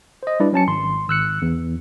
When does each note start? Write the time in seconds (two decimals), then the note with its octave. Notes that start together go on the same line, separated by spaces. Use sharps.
0.23 C5 D#5
0.40 G3 D4 E4 B4 D5
0.52 F#3 C#4 A5 C#7
0.67 G#1 C6
1.08 G#1 E6 F#6 C#7
1.42 E2